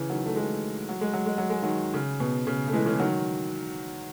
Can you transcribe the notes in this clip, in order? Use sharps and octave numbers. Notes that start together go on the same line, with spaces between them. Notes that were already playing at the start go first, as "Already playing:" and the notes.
Already playing: C#3 E3
D#3 F#3
A3
E3 G#3
F#3
G#3
F#3
G#3
F#3
G#3
D#3 F#3
C#3
B2
C#3
A3
E3 G#3
C#3 E3
D#3 F#3